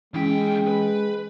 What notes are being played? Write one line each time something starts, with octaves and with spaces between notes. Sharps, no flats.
E2 E3 G#3 C#4 G5 B6
B4